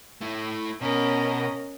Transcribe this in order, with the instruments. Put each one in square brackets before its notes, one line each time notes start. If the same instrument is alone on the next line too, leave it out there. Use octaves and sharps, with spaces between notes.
[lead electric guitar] A3 E4
[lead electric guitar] B2 [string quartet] C#4 A#4 D#5